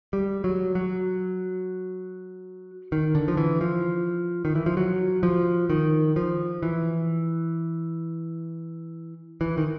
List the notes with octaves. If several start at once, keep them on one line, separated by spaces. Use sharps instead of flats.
G3
F#3
F#3
D#3
D3
F3
E3
F3
D#3
E3
F3
F#3
F3
D#3
F3
E3
E3
D#3